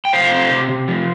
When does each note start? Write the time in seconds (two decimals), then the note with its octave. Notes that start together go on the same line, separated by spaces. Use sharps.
0.05 G5
0.12 C3 C5 F5
0.31 C4
0.51 C3
0.69 C3
0.88 F3